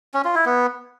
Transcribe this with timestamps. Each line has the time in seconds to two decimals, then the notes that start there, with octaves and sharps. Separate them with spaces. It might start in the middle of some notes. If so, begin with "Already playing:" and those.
0.14 C#4
0.25 F4
0.35 E4
0.46 B3